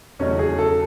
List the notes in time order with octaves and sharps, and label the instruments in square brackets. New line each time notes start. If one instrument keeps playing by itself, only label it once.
[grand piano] E2 C#3 F#3 A3 D#4 [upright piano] C#4
[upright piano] G#4
A4